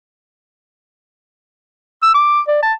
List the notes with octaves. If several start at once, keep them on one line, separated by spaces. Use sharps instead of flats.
E6
D6
D5
A5